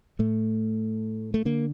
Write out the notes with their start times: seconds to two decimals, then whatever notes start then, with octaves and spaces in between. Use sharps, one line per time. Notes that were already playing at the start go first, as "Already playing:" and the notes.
0.19 A2 A3
1.34 A3
1.45 D3 A#3